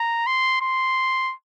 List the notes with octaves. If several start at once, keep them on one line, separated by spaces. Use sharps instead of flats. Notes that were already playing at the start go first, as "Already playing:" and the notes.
Already playing: A#5
C6
C6